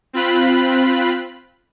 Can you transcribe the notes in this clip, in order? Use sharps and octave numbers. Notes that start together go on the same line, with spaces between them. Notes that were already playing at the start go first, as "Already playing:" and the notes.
C4 F4 B5 F#6